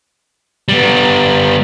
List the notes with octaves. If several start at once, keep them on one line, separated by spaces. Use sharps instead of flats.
G3 B3